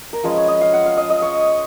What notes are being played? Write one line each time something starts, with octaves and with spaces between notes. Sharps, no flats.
A#4
F3 G#3 C#4 B4
C#5
D#5
F5
F#5
F5
D#5
D#5
C#5